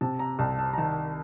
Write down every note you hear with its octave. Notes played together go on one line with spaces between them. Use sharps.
C3 A5
A#5
C2 A5
A5
A#5
D#3 A5